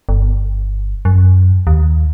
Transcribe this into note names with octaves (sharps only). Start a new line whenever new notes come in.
G1
F#2
D#2